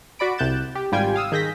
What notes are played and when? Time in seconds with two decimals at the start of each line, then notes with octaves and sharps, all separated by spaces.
0.19 F#4 D5 B5 D7
0.38 C2 C3 F#6 G6 A6 E7
0.75 G4
0.92 G#1 G3 F4 G5 G#5 G#6
1.16 F5 D#6 E6
1.32 D#3 G#4 G6 A#6 B6